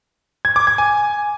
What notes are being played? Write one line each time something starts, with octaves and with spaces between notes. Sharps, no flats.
G#6
D6
G#6
G#5